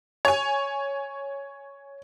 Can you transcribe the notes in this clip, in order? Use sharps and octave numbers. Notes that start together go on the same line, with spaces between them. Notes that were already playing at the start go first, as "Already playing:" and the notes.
C#5 G#5